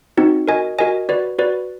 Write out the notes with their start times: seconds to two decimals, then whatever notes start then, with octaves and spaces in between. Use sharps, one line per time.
0.17 C4 D#4 F#4
0.48 F#4 A#4 D#5 G#5
0.79 F#4 A#4 D#5 G#5
1.09 F#4 B4 D5
1.39 F#4 B4 D5